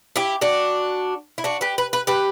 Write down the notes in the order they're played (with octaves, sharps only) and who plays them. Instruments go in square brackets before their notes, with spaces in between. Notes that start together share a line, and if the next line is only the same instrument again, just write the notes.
[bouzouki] E4 G4
D4 F#4
E4
D4 F#4
G4 B4
B4
B4
G4 B4